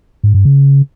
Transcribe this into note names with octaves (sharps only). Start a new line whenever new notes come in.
G#2
G2
C#3